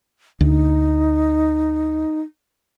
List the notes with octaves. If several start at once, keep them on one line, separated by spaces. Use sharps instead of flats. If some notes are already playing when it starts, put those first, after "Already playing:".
D2 D#4